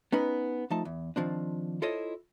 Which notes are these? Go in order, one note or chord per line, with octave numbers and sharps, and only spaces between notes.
B3 C#4 D#4 B4
F3 A3 D#4 A5
E2
D#3 F3 C4 D4
E4 F4 A4 C5 C#5 D#5